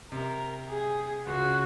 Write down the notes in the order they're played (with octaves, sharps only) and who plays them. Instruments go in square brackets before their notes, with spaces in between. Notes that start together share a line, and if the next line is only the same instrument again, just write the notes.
[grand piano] C3 [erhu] A#4
[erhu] G#4
[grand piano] C#2 C#3 [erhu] F#4
[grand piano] C#3